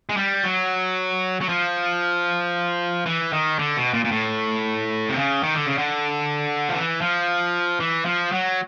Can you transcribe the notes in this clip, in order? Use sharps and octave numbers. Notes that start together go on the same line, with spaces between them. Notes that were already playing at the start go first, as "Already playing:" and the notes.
G#3
G3
F#3
F#3
F3
E3
D#3
D3
B2
A#2
A#2
A2
C3
C#3
D#3
D3
C#3
D3
F3
E3
F3
E3
F3
F#3